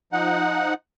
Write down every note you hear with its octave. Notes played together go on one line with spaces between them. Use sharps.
F3 D#4 F#5